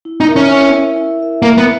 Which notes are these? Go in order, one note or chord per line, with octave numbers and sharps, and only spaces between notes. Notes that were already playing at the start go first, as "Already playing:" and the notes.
E4
D#4
A#4 E5
C#4
E4
A#4 E5
E4
A#4 E5
A#3 E4
B3